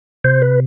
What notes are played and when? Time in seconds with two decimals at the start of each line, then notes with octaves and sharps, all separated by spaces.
0.24 C3 C5
0.42 B4